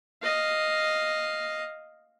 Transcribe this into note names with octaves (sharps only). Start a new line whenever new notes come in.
D#5 F5